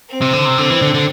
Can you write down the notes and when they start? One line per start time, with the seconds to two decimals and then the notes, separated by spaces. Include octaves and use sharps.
0.09 C4
0.22 C3
0.33 D3
0.45 C3
0.58 D3 C4
0.70 E3
0.82 D3
0.94 D3